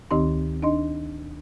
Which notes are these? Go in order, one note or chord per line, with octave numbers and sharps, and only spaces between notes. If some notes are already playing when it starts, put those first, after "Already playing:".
D2 D#3 C4 D#4 G4 C6
D4 D#4 D#5 C6